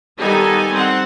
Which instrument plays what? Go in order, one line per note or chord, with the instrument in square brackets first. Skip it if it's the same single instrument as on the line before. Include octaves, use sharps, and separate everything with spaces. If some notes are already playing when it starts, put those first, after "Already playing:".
[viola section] D#3 G3 B3 D#4 A4 G#5
C4 F#5